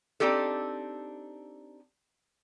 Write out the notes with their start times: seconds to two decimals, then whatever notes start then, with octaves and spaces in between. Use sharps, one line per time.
0.20 C4 D4 D#4 G4 A4